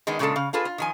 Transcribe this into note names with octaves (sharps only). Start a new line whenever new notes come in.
D#3 G#3 B3 D4
A#2 C#3 G#3 D4 A4 A5
C#3 F5
D4 F4 G#4 A4 B4
F4
D#3 F3 G#5